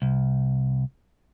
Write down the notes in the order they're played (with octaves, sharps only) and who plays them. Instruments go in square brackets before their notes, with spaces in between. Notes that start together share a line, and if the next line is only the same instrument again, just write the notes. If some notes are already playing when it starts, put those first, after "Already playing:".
[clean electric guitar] C2